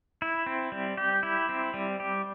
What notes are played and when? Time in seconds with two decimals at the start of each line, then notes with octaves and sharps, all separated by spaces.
0.22 E4
0.46 C4
0.72 G3
0.97 G4
1.23 E4
1.49 C4
1.74 G3
2.00 G4